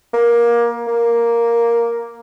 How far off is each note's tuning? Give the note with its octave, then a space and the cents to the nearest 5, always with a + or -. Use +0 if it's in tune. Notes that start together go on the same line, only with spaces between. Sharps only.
A#3 +20
A#3 +5